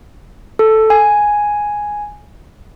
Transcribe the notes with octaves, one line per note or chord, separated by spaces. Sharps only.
A4
G#5